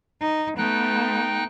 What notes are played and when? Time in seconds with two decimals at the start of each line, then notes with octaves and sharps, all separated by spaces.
0.21 D#4
0.58 A3 B3 D#4 G5 F#6